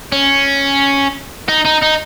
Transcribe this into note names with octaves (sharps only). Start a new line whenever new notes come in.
C#4
D#4
D#4
D#4